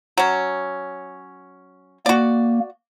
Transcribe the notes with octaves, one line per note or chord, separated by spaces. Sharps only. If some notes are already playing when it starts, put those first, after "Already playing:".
F#3 C#4
A#3 F#4 D5